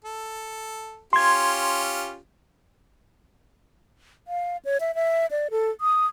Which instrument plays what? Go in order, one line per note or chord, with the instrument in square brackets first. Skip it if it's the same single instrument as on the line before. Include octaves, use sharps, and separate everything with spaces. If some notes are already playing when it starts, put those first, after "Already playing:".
[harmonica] A4
[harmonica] C#4 F4 G4 [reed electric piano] C6 G#6
[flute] F5
C#5
E5
E5
D5
A4
D#6